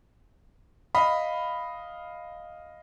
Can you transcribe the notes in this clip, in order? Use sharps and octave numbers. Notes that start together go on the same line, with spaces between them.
D#5 F5 B5